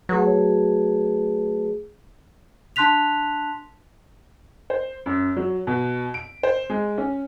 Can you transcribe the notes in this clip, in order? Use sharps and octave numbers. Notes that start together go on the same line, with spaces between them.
F#3 A3 G#4 B4
D4 A5 C6 F#6 B6 F7
C5
F#2
F#3
B2
D7
C5
G#3
C#4